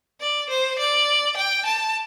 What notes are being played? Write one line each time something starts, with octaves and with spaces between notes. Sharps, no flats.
D5
C5
D5
G5
A5